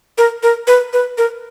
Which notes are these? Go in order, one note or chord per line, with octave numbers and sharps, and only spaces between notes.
A#4
A#4
B4
B4
A#4